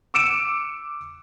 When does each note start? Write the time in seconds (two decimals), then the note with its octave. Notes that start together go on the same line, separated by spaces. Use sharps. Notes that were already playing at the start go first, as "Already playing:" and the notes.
0.14 D6 E6 C#7 D7 E7